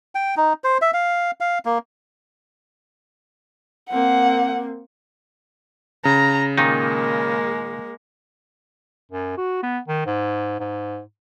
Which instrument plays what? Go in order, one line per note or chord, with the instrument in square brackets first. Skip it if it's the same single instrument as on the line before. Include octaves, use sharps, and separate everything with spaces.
[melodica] G5
D#4
C5
E5
F5
F5
A#3
[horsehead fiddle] A#3 C4 [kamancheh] F#5
[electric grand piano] C#3 [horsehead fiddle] A#5
[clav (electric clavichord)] A#2 D#3 D#4 [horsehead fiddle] G#3 A#3
[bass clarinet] F#2
F#4
B3
D#3
G#2
G#2